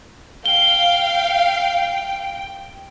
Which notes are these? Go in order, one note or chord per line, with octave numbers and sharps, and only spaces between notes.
F5 G5 G7